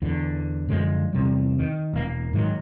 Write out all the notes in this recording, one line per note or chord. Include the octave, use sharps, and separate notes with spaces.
E2 D3
F#2 D3 F3 G#3
E2 C3 G3
D#3
E1 A#3
G#2 D#3 F#3